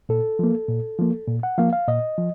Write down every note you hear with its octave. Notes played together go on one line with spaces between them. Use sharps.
A#2 A4
F3 A#3
A#2
F3 A#3
A#2
F#5
F3 A#3 F5
F5
A#2 D#5
F3